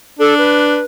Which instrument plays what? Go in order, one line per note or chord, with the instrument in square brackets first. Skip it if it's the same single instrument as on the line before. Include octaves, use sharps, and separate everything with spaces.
[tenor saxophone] D4 [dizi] A4
[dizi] B4